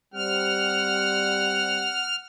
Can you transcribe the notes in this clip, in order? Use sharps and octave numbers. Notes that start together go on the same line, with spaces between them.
G3 C4 F#5 F6